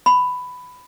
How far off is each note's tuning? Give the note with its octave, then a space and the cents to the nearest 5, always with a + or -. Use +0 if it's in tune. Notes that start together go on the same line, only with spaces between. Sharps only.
B5 +10